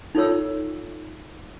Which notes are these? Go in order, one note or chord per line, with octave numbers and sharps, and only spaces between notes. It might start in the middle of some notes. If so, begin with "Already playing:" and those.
D#4 F4 A4 C#5 E6